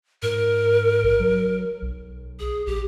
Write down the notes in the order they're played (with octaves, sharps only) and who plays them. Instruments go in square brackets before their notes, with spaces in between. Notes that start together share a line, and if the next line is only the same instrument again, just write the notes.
[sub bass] G#2 [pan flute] A#4
[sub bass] A#1
F#3
B1
[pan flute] G#4
[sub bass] A#1 [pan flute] G4